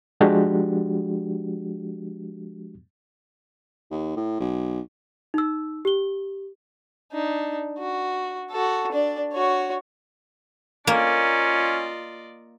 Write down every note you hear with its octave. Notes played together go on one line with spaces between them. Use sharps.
F3 G#3 D4 F#4 G4
D#2
A2
B1
D#4 E6
G4 G7
D4 D#4
F#4
F#4 A4
D4 D5
F#4 C#5
A#3 C#4 F4 D5 D#5